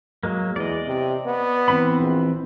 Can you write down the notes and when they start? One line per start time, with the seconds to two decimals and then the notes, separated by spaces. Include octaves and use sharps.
0.23 F#3 G#3 A#3
0.56 E2 D5 D#5
0.87 C3
1.26 B3
1.68 E3 C4 B5
1.99 A#1